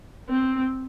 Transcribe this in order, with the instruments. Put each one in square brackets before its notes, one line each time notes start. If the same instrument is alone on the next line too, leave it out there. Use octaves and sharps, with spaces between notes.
[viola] C4